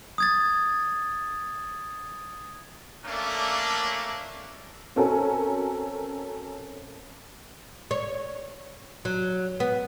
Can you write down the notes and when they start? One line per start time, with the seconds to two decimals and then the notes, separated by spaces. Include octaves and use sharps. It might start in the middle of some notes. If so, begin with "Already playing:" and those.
0.18 D#6 G#6 A6
3.05 A3 A#3 C#4 D4
4.96 C4 C#4 F#4 A4 A#4 G#5
7.91 C#5
9.05 F#3
9.60 B3